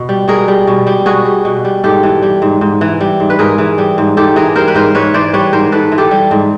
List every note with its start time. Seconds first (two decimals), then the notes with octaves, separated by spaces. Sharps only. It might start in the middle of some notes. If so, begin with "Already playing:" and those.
Already playing: B2
0.09 G3
0.28 B2 G#4 A#4
0.48 G3
0.67 B2
0.87 G3
1.06 B2 F#4 G#4
1.25 G3
1.45 B2
1.65 G3
1.84 G#2 G4 A4
2.03 E3
2.23 G3
2.42 G#2
2.61 G#2
2.81 E3
3.00 G3
3.20 G#2
3.30 B4
3.39 G#2 G#4 A#4
3.58 E3
3.78 G3
3.98 G#2
4.17 G#2 G4 A4
4.36 E3 G#4 A#4
4.56 G3 A#4 C5
4.68 B4
4.75 G#2 A#4 C5
4.95 G#2 B4 C#5
5.14 E3 C5 D5
5.33 G3 B4 C#5
5.53 G#2 A#4 C5
5.72 G#2 A4 B4
5.92 E3
5.98 G4 A4
6.11 G3
6.31 G#2